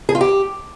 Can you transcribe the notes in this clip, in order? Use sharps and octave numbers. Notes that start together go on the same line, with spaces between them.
G#4
F4
G4